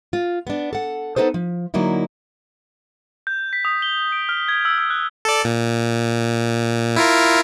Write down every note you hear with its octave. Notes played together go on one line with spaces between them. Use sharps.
F4
B3 D4
A4 F#5
B3 D#4 A4 B4 C5
F3
D3 F#3 A#3 D#4 E4
G6
B6
D#6
G7
D7
F6
G#6
E6
E6
F#6
A4 D5
A#2
E4 F4 A#4